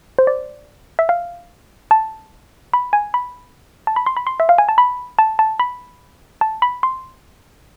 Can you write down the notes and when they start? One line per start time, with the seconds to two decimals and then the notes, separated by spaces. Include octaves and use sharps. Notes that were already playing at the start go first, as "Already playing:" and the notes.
0.19 C5
0.27 D5
0.99 E5
1.09 F5
1.91 A5
2.74 B5
2.93 G#5
3.14 B5
3.87 A5
3.96 B5
4.06 C6
4.17 B5
4.27 C6
4.40 E5
4.49 F5
4.58 G#5
4.69 A5
4.78 B5
5.19 A5
5.39 A5
5.60 B5
6.41 A5
6.62 B5
6.83 C6